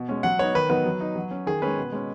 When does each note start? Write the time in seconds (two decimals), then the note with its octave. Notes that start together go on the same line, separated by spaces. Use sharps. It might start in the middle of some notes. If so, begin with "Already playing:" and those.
Already playing: B2
0.09 G#3 C#4
0.23 F#3 F#5
0.39 B3 D#4 C#5
0.55 D#3 B4
0.69 F#3 B3 D#4 B4
0.86 F#3
1.01 D#4
1.16 F#3
1.31 C#4
1.46 D#3 G#4
1.62 G#3 C#4 B4
1.77 B2
1.92 G#3 C#4